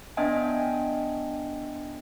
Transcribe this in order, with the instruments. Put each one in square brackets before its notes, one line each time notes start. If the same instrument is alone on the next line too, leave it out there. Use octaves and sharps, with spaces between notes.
[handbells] B3 D4 D#5 E5 G5 G#5